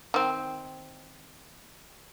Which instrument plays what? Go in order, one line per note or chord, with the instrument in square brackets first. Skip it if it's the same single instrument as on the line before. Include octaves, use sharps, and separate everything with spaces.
[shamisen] D#3 C4